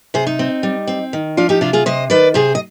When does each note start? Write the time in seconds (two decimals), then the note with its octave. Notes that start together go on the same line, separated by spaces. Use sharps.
0.14 C3 G#4 C5
0.27 D#4
0.39 C4
0.63 G3
0.87 C4
1.13 D#3
1.37 F3 D4 F4
1.49 D#4 G4
1.61 C3 D4 F4
1.73 F4 G#4
1.86 C3 C5 D#5
2.10 D#3 B4 D5
2.34 C3 G#4 C5
2.55 D#5